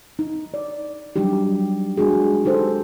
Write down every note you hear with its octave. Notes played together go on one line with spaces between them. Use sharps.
D#4
D5
F#3 G3 D4 D#4 G4
G#3 D4 F#4 G#4
D#4 G4 A4 C5